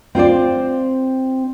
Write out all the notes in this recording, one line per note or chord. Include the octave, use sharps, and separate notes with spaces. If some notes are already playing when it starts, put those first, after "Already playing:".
C4 F4 C5 D5